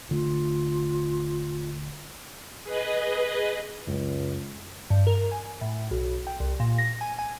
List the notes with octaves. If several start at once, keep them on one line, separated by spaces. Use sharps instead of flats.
D#1 D3 A3 F4
G#4 B4 D#5
C#2 F#2
G2
A#4
G#5
A2
B1
G5
C2
A#2
A#6
G#5
G#5